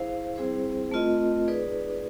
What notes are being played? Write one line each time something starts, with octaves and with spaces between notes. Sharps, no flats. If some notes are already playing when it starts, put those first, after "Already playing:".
Already playing: E4 G#4 C5 F5
G3 C4 E4 G#4 C5
A3 C4 F4 A#4 D#5
D#4 G#4 B4 D5